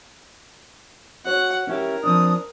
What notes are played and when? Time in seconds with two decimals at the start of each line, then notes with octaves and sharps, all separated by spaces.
1.25 F#4 C#5 F#5
1.67 C#4 E4 G4 A#4
2.04 F3 C4 D4 D#6